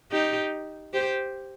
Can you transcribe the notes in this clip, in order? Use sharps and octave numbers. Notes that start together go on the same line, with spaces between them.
D#4 G4
G4 C5